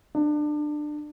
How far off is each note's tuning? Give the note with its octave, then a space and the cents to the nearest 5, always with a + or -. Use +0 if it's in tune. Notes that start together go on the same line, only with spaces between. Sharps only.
D4 +25